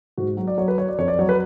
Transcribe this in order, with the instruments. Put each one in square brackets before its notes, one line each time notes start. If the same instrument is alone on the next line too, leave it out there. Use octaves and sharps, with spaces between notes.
[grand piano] G#2 F#4
F#3
D5
F#3 C#5
B4
F#3 C#5
D5
F2 C#5
D5
F#3 C#5
B4